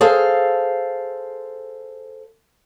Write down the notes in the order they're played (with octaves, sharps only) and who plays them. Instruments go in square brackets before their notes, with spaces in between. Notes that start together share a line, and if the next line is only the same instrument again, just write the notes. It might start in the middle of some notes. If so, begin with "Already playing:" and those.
[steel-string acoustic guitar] G#4 A4 C5 F5